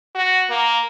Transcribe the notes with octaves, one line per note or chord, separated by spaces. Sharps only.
F#4
A#3